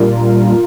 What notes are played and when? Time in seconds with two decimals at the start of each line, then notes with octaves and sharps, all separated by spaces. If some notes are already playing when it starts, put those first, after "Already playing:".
Already playing: A#2 G3 D4 F4 A#4